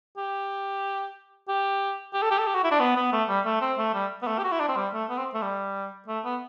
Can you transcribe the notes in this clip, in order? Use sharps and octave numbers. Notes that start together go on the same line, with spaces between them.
G4
G4
G4
A4
G4
A4
G4
F#4
E4
D4
B3
B3
A3
G3
A3
C4
A3
G3
B3
A3
G4
F#4
E4
D4
C4
G3
A3
B3
C4
A3
G3
A3
B3